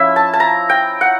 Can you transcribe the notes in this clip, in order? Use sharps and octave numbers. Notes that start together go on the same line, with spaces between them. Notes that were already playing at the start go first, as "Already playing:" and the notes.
Already playing: F3 C#4 E4 E5
A5
A5
A#5
G5
F#5